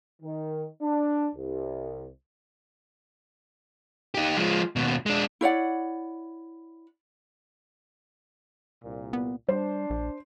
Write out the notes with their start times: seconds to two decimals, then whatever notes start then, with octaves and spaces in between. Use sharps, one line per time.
0.22 D#3
0.81 D4
1.35 C2
4.15 D#4 G4
4.37 F3 G#3
4.76 D#2 B2
5.06 G#3 D4
5.41 E4 C#5 D5 F#5
8.83 C2 A#2
9.13 B3
9.49 G3 D4 C5
9.90 A#1